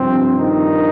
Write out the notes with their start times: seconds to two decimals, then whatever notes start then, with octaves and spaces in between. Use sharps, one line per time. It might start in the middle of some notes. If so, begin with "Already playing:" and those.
Already playing: G2 C3 F3 C4
0.38 D#3 D#4